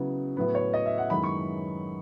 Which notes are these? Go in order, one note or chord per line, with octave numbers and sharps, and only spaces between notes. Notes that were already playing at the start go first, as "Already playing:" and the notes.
Already playing: C#3 F#3 B3 E4
A2 F#3 B3 B4
C#5
D#5
E5
F#5
F#2 D#3 G#3 B3 E4 B5
C#6